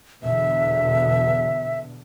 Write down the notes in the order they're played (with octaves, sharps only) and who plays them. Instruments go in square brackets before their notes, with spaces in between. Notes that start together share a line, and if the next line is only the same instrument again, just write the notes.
[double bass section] E2 B2 D3 [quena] E5